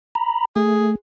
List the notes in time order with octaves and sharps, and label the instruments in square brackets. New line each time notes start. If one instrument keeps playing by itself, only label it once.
[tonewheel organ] A#5 B5
[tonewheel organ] A3 [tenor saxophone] G#4